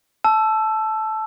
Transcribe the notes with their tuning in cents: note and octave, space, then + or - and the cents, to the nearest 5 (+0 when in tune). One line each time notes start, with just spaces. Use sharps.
A5 -15 E6 +15